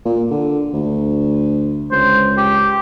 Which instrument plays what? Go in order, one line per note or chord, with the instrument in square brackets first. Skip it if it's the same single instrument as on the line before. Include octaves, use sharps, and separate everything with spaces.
[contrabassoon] A#2
D3
D2
[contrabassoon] C#2 [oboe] C5
[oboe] G4